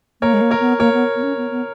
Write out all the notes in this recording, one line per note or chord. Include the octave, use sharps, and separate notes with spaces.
A#3 A#4 C#5
G#3
A#3
A#4 C#5
B3
A#3 A#4 C#5
B3
B3
C#4
B3
B3